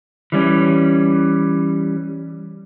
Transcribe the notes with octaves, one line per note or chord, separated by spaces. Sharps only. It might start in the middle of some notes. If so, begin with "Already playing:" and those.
E3 G3 C#4